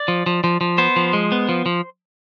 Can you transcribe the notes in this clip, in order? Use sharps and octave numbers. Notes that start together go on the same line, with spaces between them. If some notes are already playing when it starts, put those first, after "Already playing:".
Already playing: D5
F3
F3
F3
F3
B3 C5
F3
G#3
B3
F3
F3